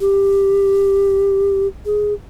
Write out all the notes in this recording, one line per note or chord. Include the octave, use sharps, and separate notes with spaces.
G4
G#4